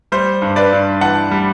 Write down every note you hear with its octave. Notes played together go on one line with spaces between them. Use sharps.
G3 C5
G2
B4 D5
G2
E3 F#5 A5
G3